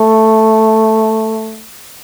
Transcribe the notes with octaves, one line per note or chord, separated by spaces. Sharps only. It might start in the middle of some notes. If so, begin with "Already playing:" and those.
Already playing: A3